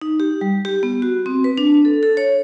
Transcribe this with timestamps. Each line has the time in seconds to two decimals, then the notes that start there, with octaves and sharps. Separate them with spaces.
0.02 D#4
0.20 G4
0.41 G3
0.65 G4
0.83 B3
1.02 F#4
1.26 C4
1.44 B4
1.58 D4
1.85 A4
2.03 A4
2.17 C#5